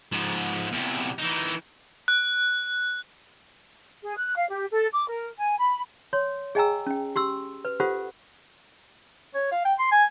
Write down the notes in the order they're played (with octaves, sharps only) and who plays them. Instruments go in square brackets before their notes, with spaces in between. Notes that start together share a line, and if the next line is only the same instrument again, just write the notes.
[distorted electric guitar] G#2 F3
E2 C3
E3 D#4
[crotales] F#6
[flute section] G#4
F#6
F5
G4
A4
D6
A#4
G#5
B5
[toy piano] C#5 C6
G#4 D#5 G5 G#5 A#5 E6
C#4 G5
G4 C6 E6
B4
F4 G4 A4 C5 F#5
[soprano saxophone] C#5
F5
G5
C6
G#5